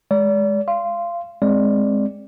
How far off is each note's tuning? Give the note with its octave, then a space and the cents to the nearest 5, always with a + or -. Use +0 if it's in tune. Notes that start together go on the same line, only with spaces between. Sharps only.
G#3 +0 D5 -35
F5 -25 C6 -5
G#3 +0 C4 +10 D5 -5